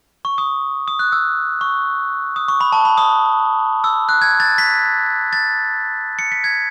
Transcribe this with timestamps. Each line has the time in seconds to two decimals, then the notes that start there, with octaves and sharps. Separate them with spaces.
0.25 C#6
0.38 D#6
0.88 D#6
0.99 F#6
1.12 E6
1.61 C#6
2.36 D#6
2.48 C#6
2.61 B5
2.72 A5
2.85 B5
2.98 D#6
3.84 E6
4.09 F#6
4.22 G#6
4.40 A6
4.58 B6
5.33 A6
6.19 C#7
6.32 B6
6.44 G#6